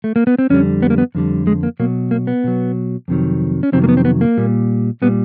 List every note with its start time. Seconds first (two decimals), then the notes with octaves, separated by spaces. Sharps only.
0.04 A3
0.16 A#3
0.27 B3
0.39 C4
0.50 F2 D3 G3 C#4
0.82 B3
0.90 A#3
0.98 B3
1.15 F2 D3 G3
1.47 G#3
1.63 A#3
1.80 B2 F#3 A#3
2.11 A#3
2.27 B3
2.44 B2 F#3
3.08 F2 C3 D#3 F#3
3.63 C#4
3.72 F2 C3 D#3 F#3 C4
3.84 A#3
3.89 B3
3.97 C4
4.05 B3
4.21 A#3
4.38 A#2 G3
5.02 A#2 G3 B3